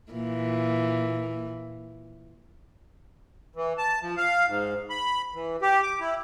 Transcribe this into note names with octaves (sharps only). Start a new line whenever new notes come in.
A#2 E3
E3
A5
F3
F5
G#2
B5
E3
G4
D6
E4